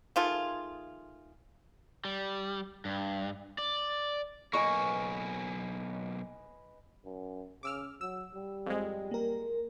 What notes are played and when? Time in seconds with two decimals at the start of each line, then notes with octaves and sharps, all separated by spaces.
0.16 D#3 A3 F4 G#4
2.05 G3
2.85 G2
3.58 D5
4.53 B1 A#3 B4 D#5 G#5 C#6
7.05 F#2
7.63 C#3 D6 E6 F6
8.01 F#3 E6
8.35 G3
8.66 F2 G#3
9.11 A#3 A#4